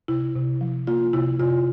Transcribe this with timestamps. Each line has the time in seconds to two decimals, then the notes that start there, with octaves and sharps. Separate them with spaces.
0.08 C3 E4
0.35 C3
0.61 F3
0.87 A#3 F4
1.13 C3 E4
1.40 C3 F4